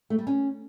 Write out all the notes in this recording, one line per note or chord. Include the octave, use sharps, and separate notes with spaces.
A3
G3
C#4